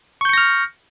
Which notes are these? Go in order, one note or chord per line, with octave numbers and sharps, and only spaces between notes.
C#6 F6 G6 A#6 C#7